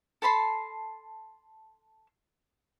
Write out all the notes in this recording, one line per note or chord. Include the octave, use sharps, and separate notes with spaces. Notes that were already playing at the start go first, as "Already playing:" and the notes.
A4 A5 B5 C6